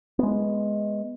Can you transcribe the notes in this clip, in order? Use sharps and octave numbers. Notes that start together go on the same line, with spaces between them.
G#3 B3